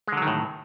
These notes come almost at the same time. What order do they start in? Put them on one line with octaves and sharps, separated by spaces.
G#3 D3 F#3 D#3 A2